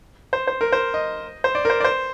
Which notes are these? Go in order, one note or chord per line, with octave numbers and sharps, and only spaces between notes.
C5
C5
A#4
C5
D#5
C5
D5
A#4
C5
D5
C5